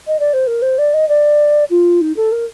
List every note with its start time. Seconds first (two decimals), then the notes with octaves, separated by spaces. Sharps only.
0.07 D#5
0.19 D5
0.33 C5
0.47 A#4
0.62 C5
0.78 D5
0.94 D#5
1.09 D5
1.70 F4
2.01 D#4
2.16 A4
2.32 A#4